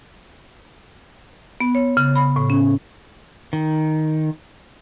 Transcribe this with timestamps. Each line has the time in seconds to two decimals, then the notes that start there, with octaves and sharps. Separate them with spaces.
1.60 B3
1.75 C#5
1.97 C#3
2.16 B5
2.36 A2
2.50 C#4
3.53 D#3